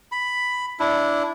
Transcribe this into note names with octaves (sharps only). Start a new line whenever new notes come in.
B5
D4 E4